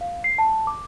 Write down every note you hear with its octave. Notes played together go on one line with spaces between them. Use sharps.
F5
C7
A5
D6